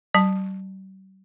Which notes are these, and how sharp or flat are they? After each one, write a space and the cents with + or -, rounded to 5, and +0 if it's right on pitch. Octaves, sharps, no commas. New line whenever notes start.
G3 -45 A5 +0